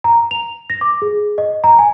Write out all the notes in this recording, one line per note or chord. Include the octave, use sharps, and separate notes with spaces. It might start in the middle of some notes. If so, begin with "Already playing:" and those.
A#5
F7
A#6
D6
G#4
D#5
A#5
G#5